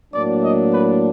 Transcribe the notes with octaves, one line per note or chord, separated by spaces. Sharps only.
A2 F#3 A#3 D4 D5
D#5
B4